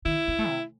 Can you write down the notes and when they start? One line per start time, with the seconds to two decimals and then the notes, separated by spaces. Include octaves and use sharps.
0.05 D#3 E4
0.28 C4
0.39 A3
0.49 C3